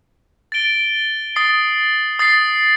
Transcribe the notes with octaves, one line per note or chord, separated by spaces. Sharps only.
A6 D7 G7
D#6 A6 C7
D#6 A6 C7